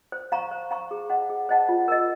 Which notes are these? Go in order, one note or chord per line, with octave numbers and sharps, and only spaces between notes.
C5
F5 A#5 C#6
C5
F5 A#5 C#6
G#4
C5 D#5 F#5 A5
G#4
C5 D#5 F#5 A5
F4
A#4 D#5